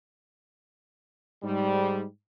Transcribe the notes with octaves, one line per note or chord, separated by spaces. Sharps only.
G#2 G3